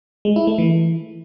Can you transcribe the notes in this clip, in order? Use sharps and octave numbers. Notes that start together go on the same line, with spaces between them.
G#3
E4
A3
E3